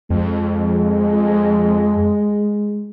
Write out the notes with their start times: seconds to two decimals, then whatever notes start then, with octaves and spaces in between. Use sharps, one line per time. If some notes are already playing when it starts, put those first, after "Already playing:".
0.10 F2 G#3